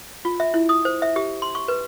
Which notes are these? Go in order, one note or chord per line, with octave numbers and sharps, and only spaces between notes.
F4
E5
E4
D#6
C5
E5
G4
C6
C#6
B4